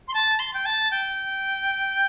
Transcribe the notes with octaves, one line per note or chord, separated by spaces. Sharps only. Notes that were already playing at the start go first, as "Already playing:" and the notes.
C6
A5
C6
G5
A5
G5